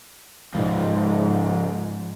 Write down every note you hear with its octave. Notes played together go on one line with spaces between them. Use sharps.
C#2 G#2 F3